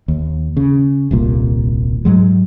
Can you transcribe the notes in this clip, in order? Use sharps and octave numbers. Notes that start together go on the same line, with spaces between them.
D#2
C#3
D#1 C2 A#2
G#2 F#3 G#3